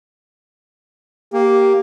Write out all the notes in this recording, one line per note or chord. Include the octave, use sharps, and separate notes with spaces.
A#3 G4